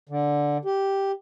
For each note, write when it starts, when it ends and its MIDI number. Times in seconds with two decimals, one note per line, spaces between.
0.09 0.58 50
0.65 1.12 67